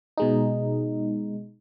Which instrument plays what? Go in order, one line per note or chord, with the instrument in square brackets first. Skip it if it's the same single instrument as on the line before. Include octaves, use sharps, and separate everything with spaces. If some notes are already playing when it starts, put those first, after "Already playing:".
[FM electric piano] B2 G#3 D#4